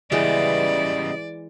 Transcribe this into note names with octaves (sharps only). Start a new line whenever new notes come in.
C#3 E3 G3 G#3 B3 D5 D#5 G5